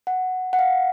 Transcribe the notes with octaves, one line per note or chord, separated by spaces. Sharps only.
F#5
F#5
F5